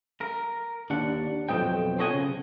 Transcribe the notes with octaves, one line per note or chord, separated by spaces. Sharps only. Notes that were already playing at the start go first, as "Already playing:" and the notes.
A#4
D#2 D4 F#5
B1 F2 G#3 C4 D#5 G5
C4 A4 C#5 D#5 F#5 G#5
C#3